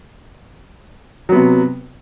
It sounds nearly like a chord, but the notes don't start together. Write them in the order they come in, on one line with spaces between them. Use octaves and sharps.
F#3 B3 C3